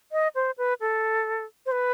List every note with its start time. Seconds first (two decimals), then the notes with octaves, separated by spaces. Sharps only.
0.12 D#5
0.35 C5
0.58 B4
0.81 A4
1.66 C5
1.72 B4